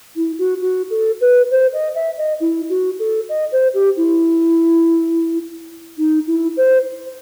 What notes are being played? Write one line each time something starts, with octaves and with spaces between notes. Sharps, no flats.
E4
F#4
F#4
A4
B4
C5
D#5
E5
D#5
E4
F#4
A4
D#5
C5
G4
E4
D#4
E4
C5